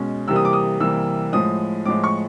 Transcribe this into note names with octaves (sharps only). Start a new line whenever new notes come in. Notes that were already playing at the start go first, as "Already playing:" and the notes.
Already playing: B2 G#3 C#4
C3 E3 G3 A#3 E6
D#6
D6
D#6
C3 E3 G3 A#3 E6
A2 F3 G#3 D#6
A2 F3 G#3 D6
C#6